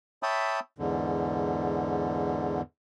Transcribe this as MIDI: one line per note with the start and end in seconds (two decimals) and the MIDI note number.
0.23 0.60 73
0.23 0.60 76
0.23 0.60 79
0.23 0.60 81
0.23 0.60 83
0.23 0.60 87
0.79 2.61 40
0.79 2.61 44
0.79 2.61 50